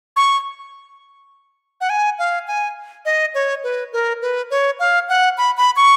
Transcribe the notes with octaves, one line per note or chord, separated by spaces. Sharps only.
C#6
F#5
G#5
F5
G#5
D#5
C#5
B4
A#4
B4
C#5
F5
F#5
B5
B5
C#6